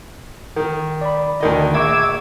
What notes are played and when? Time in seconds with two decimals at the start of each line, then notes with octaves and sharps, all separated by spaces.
0.56 D#3
1.01 D5 B5
1.40 D2 D#3 D#5
1.74 A#1 E5 C#6 D6 E6 G#6